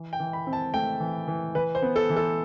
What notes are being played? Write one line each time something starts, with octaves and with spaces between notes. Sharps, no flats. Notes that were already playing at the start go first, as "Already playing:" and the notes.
Already playing: E3
G5
E3
B5
C4
A5
A3 G5
E3
E3
E3 B4
C5
B3
A4
E3
A4